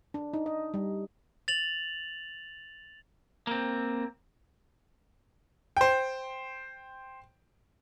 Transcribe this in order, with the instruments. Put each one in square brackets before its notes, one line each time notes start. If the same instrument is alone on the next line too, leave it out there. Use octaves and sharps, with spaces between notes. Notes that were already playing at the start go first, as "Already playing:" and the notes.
[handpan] D4
D#4
D#5
G3
[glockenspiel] A6 F7 F#7
[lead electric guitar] A#3 C4
[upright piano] C5 G5